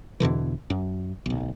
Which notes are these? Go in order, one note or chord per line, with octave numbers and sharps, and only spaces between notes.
E2 B2 D3 E3
F#2
D1 B1